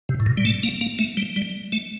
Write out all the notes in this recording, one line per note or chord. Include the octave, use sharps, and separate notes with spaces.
C3
A2
A#2
G3
A3
A#3
A#3
A3
G3
G3
A3